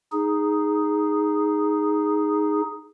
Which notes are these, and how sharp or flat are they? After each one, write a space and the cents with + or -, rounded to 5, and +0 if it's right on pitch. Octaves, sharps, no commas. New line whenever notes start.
D#4 +0 G#4 +0